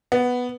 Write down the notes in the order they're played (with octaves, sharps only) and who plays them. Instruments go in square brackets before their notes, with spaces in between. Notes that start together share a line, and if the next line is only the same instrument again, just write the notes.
[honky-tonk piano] B3